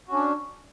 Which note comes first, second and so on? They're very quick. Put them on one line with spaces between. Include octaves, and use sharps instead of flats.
F#4 C#4 D4